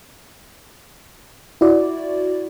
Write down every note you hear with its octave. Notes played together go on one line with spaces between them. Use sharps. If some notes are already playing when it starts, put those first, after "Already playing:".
E4 F#4 D5